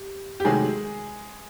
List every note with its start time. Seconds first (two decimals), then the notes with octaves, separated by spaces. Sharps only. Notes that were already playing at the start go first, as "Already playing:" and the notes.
Already playing: G4
0.40 G4
0.44 C3 D#3 F#3 G#3 A3 G#4